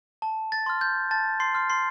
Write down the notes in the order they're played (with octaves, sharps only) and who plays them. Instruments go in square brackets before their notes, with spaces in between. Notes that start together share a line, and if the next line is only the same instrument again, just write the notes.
[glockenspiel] A5
A6
C6 F6
G6
A5 A6
C6 C7
C6 F6
C6 C7